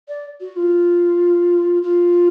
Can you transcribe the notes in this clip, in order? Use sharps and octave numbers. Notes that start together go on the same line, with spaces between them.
D5
F#4
F4
F4